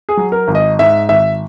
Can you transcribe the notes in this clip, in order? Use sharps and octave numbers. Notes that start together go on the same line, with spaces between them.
G#4
F#3
A#4
G#1
D#5
G#2 E5
G#1 E5